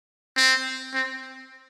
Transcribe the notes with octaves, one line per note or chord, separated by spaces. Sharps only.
C4
C4